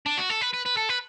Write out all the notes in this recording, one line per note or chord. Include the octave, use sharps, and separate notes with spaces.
D4
F#4
A4
B4
B4
B4
A4
B4